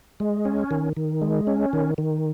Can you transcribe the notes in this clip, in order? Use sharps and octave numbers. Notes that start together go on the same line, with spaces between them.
G#3
C#4
D#3
D#3
G#3
C#4
D#3
D#3